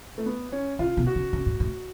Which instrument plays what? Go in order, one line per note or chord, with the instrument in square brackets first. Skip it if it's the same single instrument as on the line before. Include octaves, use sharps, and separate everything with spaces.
[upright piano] A3
B3
C#4
[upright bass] C#3 [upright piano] F4
[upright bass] B2
[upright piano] F#4
[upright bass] C#3
C#3
A2
A2